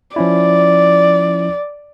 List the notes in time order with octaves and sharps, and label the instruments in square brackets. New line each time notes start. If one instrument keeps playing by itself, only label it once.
[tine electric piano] F3 C#4 E4 [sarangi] D5